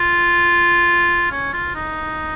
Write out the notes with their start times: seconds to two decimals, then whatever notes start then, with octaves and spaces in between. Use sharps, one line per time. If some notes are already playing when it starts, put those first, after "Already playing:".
Already playing: F4
1.32 C#4
1.53 F4
1.75 D#4